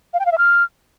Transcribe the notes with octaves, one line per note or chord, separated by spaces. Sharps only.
F5
G5
F5
E5
F6